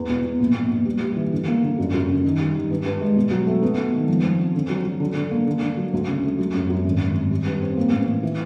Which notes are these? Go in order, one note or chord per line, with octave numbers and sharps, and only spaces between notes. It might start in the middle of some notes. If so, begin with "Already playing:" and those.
Already playing: E2
B2
B2
A#1
A#1
A#1
G3
G3
E3
D3
A#3
D3
F#2
F#2
C#3
D#3
G3
D#3
G2
G2
G#3
B2
F#3
A3
B3
B3
D#3
F3
F3
C4
D3
F#3
F#3
D3
D3
A#3
D3
D3
F#3
D2
C#3
A3
F#3
F#2
F#2
G#1
G#1
G#1
G3
G2
C4
A#3
A1
A1
E3